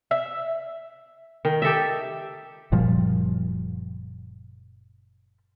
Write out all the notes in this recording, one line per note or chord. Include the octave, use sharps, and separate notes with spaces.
E5
D#3
G4 A4 D#5 E5
F#1 A#2 F3 G3